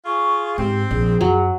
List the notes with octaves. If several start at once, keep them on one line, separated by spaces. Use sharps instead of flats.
F4 G#4 C#6
G#2 C4 G4
A#1 G#4
F#2 F#3